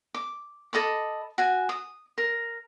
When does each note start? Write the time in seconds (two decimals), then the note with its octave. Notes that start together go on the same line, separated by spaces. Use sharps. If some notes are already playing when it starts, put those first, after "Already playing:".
0.14 D6
0.73 A4 D#5 B5 D6
1.38 F#4 G#5
1.69 D#6
2.18 A#4